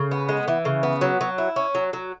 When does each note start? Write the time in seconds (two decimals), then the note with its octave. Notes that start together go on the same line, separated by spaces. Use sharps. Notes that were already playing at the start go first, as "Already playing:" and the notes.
Already playing: C#3
0.11 B3
0.29 G#3
0.48 E3
0.65 C#3
0.83 B3
1.01 F#3
1.21 F#3
1.38 E4
1.56 C#4
1.75 F#3
1.93 F#3